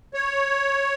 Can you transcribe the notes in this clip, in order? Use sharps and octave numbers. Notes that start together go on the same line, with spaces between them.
C#5